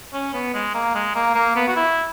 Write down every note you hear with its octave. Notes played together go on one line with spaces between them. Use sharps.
C#4
B3
G#3
A#3
G#3
A#3
A#3
B3
F#4
E4